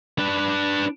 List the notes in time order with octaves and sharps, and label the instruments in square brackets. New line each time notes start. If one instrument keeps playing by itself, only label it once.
[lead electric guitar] D4 B4